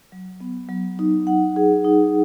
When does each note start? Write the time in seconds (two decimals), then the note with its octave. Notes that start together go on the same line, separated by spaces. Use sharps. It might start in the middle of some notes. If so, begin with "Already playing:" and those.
0.12 F#3
0.40 B3
0.69 F#3
0.99 D#4
1.27 F#5
1.56 G#4
1.84 D#4